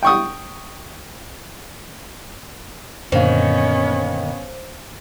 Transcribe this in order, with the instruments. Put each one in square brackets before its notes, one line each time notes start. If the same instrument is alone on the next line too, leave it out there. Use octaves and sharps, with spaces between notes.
[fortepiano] G5 C#6 D#6
[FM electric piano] F#2 A#2 D3 [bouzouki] D#3 [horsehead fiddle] B3 C#4 [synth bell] C5 F5